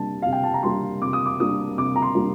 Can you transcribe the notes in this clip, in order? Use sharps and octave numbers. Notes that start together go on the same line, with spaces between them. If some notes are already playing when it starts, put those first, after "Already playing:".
Already playing: C3 G3 A#3 D4 A5
C3 F5
G5
A5
A#5
G3 A#3 D4 C6
C3 D6
D#6
D6
G3 A#3 D4 D#6
C3 D6
A#5
C6
G3 A#3 D4